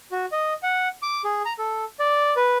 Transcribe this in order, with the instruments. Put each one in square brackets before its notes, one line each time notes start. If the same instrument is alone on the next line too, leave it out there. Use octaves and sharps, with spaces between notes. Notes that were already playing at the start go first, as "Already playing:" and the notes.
[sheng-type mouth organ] F#4
D#5
F#5
D6
G#4
A#5
A4
D5
B4